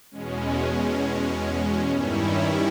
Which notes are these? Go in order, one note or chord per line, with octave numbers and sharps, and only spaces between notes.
E2 B2 G#3 C#4
G2 D#3 G3 C#4 E4